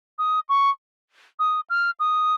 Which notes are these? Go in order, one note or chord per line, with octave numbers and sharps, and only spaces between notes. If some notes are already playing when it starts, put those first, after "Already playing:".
D#6
C#6
D#6
F6
D#6